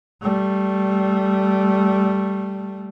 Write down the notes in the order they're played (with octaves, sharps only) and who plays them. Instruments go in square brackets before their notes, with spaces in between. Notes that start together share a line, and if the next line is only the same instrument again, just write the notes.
[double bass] G3 A3